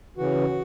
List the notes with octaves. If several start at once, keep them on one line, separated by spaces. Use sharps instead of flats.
C#3 E3 F#4